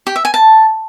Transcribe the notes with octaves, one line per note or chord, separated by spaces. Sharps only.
G4
E5
G#5
A5